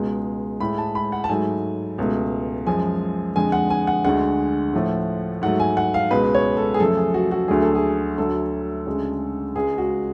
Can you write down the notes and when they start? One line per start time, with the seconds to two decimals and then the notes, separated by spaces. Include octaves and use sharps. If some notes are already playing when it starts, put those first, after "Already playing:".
Already playing: C#2 B2 G#3
0.60 A2 G#3 B5
0.78 A5
0.95 B5
1.12 F#5
1.24 A5
1.29 G#2 F#3 A3 G#5
1.98 C#2 B2 A3
2.66 F#2 F3 G#3 G#5
3.36 F2 D3 G#3 G#5
3.52 F#5
3.70 G#5
3.87 F#5
4.04 D2 D3 G#3 F#5
4.73 A2 F3 A3
5.42 G#2 F#3 A3 F#5
5.60 G#5
5.77 F#5
5.94 F5
6.11 C#2 B2 G#3 B4
6.35 C#5
6.57 A4
6.74 G#4
6.80 F#2 C#3 F3 A3 A4
6.97 G#4
7.14 F#4
7.31 F#4
7.48 D2 D3 F#3 A3 G#4
7.63 A4
7.75 G#4
8.18 D2 D3 F#3 A3 A4
8.86 D2 C#3 G#3
9.56 C#2 C#3 G#3 G#4
9.78 F#4